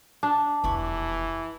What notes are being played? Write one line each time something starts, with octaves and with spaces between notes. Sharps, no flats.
D4 A5
E1 F2 E3 G4 B5 C#6